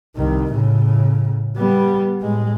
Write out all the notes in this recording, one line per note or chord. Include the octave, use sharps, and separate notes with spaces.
C2 D#3
A2 C#3
G3 B3
A2 G#3